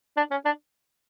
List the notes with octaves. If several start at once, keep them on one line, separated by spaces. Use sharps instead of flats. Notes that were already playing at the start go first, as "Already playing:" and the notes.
D4
C#4
D4